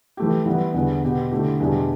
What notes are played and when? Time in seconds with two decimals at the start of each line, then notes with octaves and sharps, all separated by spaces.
0.17 E3 A3 G4
0.46 E3 G3 B3
0.74 E2 D3 G3 B3
1.03 B2 B3 G4
1.31 D3 A3 E4 G4
1.60 E2 B2 G3 D4 G4